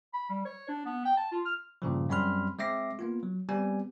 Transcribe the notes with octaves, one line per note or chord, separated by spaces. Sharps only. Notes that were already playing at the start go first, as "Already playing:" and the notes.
B5
G3
C#5
D4
B3
G5
A5
F4
F6
G2 A#2 C#3 F3
F#2 G3 C4 B5 C6 F6
G#3 C4 E5 D6 A#6 C7
A#3 B3 F4
F#3
G3 B3 C4 G4 G#5